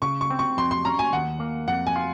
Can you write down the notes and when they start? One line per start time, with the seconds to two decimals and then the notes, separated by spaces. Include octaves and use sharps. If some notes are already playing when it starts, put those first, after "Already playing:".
0.02 C#3 C#6
0.21 C#6
0.30 C4
0.39 C#6
0.57 F2 C6
0.71 C6
0.85 C#4 A#5
0.99 G#5
1.13 D#2 F#5
1.40 A#3
1.68 F2 F#5
1.87 G#5
1.96 F4